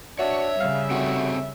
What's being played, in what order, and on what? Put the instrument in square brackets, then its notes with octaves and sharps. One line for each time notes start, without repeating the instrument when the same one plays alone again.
[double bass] D4 [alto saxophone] F#4 [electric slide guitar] C#5 [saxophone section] E5
[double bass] C#3 G3 [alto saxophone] F5
[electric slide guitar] C4 G4 A4 [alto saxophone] F#4